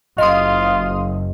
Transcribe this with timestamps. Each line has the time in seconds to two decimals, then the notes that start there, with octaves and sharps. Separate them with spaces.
0.18 F#1 F4 D#5 F5 C6 D#6